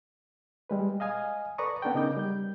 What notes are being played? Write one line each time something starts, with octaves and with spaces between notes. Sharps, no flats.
G3 G#3 B4
D#5 F5 G#5 D#6
A4 B4 D5 A#5 C#6 D#6
B3 D4 A4 G5
C#3 D#4 A#4 D#5 D6 G6
G3 G6